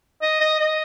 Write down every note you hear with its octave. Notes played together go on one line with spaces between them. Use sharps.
D#5
D#5
D#5